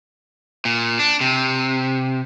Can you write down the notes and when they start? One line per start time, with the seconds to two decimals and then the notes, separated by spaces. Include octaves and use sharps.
0.65 A#2
0.99 D4
1.21 C3